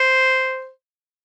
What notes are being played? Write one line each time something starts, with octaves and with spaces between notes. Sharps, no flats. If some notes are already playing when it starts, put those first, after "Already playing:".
Already playing: C5